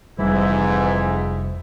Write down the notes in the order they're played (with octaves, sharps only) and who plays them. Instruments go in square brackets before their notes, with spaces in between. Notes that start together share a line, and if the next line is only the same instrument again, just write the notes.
[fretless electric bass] F1 G3 [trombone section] F2 G#2 [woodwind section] E3 E4